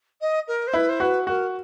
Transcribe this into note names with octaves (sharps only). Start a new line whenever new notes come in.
D#5
A#4
C5
E4 B4
C5
F#4 B4
F#4 A#4